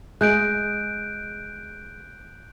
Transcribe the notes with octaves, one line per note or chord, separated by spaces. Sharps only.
G#3 F#6 G6 D7